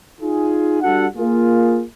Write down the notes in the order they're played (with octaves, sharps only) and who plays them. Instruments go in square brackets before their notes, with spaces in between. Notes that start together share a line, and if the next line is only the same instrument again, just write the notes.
[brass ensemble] D#4 F4 G#4
G3 D4 F#4 A4 F#5
A#3 F4 G#4